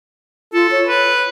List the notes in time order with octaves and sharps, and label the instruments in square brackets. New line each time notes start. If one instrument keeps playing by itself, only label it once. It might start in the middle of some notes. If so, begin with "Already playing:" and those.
[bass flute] F4 [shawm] A4
[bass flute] C#5
[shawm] B4